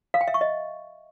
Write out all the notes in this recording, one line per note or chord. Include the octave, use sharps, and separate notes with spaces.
F5
G5
E5
C#6
D#5